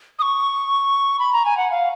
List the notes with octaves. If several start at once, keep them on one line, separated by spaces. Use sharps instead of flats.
D#6
C#6
B5
A#5
G#5
F#5
F5